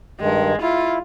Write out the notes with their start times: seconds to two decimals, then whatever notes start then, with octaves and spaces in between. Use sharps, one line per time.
0.20 G2 D#3 G#3
0.61 E4 F4